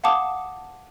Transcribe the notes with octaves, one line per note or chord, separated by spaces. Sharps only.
F5 F#5 A5 D6 D#6